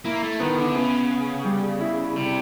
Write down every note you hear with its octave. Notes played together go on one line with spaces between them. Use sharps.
A#3 E4
A3
D#3 B3
D3
C#3 B3
B3
G3
E4
C3 G3